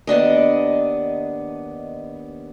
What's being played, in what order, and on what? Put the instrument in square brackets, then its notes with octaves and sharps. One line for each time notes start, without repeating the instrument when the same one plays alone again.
[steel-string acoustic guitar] D#2 B3 D4 D#5